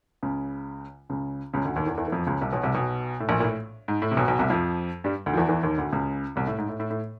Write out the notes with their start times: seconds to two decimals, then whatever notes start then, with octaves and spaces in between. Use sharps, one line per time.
0.23 C#2 C#3
1.10 C#2 C#3
1.53 C#2 C#3
1.65 D2 D3
1.76 D#2 D#3
1.86 E2 E3
1.97 E2 E3
2.08 E3
2.12 F2 F3
2.26 C#2 C#3
2.41 C2 C3
2.52 B1 B2
2.63 C2 C3
2.74 B1 B2
3.20 A2
3.29 A#1 A#2
3.40 A#2
3.44 A2
3.88 G#2
4.02 A2
4.11 C3
4.17 B1 B2
4.28 B1 B2
4.39 C2 C3
4.50 F2 F3
5.04 G2 G3
5.26 D2 D3
5.33 F3
5.37 E2 E3
5.49 E2 E3
5.63 D#2 D#3
5.77 D2 D3
5.92 C#2 C#3
6.36 C2 C3
6.47 A2
6.58 G#2
6.69 A2
6.80 A2
6.90 A2